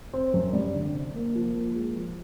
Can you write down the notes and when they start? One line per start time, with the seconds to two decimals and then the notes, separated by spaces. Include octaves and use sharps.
0.14 C4
0.34 F#2
0.53 G3
0.74 D3
0.94 C3
1.14 A#3
1.35 F3
1.55 A#3
1.75 G#3
1.96 F3